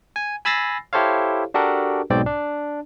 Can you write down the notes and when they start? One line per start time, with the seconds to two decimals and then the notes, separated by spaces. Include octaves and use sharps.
0.16 G#5
0.45 G#5 B5 E6 A6 A#6 C7
0.93 E4 G4 A4 C5 C#5 F5
1.54 D4 F#4 G4 A4 A#4
2.10 B1 G#2 B2 C4 D5 G5
2.26 D4